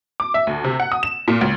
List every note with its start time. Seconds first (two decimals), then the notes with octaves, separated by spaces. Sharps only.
0.20 D6
0.34 E5
0.47 D2
0.64 C3
0.80 F#5
0.92 D#6
1.03 E7
1.28 A#2
1.41 C#2